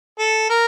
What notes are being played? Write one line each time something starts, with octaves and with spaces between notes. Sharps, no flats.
A4
A#4